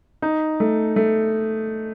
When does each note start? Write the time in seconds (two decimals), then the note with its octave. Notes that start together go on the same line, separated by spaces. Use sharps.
0.22 D#4
0.60 A3
0.96 A3